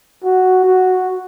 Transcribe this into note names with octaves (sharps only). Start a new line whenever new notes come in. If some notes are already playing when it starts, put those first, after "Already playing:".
F#4
F#4